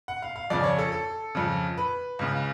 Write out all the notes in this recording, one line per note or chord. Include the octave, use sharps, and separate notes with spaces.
F#5
F5
F5
F2 C#3 D5
C#5
A4
A4
F2 C#3
B4
C#2 C#3